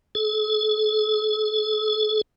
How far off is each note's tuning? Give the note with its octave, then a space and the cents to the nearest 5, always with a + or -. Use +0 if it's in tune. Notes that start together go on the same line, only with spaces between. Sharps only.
A4 -45